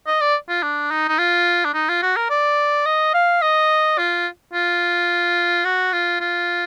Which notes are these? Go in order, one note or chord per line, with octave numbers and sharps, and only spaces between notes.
D#5
D5
F4
D4
D#4
D#4
F4
D4
D#4
F4
F#4
A#4
D5
D#5
F5
D#5
F4
F4
F#4
F4
F4